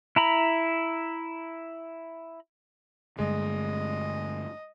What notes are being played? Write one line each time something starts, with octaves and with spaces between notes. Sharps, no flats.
E4 A#5 B5
G2 D3 G#3 A3 D#5